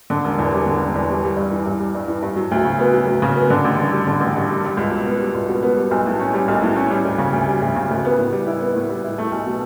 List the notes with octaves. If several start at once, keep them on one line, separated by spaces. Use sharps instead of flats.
D3
E1
E2
G3
D3
E1
E2
G3
G3
G2
E3
G2
G3
G2
E3
G2
F#3
D2
C#3
B3
F#3
D2
C#3
B3
D3
A1
G2
G3
D3
A1
G2
G3
G3
C#2
B2
B3
G3
C#2
B2
B3
G3
B1
A2
C#4
G3
B1
A2
C#4
G3
D2
C#3
D2
G3
D2
C#3
D2
B3
A2
G3
E4
B3
A2
G3
E4
A3
B1
B2